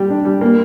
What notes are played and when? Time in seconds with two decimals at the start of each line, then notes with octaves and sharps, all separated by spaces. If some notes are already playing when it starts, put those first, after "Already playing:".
Already playing: G3 G4
0.10 D4
0.25 G3
0.41 A#3